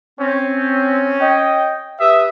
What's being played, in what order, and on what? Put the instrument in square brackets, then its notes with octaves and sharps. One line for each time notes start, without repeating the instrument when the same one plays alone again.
[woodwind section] C4 [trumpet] C#4
[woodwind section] D#5 G5
[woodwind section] G4 B4 D#6 [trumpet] E5